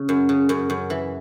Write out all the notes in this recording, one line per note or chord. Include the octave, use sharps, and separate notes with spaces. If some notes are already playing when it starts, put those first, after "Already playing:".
Already playing: C#3
F#2
C#3
F#2
F#2
E3